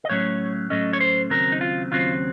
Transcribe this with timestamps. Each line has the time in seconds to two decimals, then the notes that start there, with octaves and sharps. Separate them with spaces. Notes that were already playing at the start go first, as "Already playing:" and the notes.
0.05 D#5
0.10 A2 F#3 A3 C#4 C#5
0.70 A2 F#3 A3 C#4 D#5
0.93 C#5
1.00 C5
1.30 D#2 C#3 F#3 C4 A#4
1.52 D#4
1.61 F4
1.91 D#2 C#3 F#3 C4 F4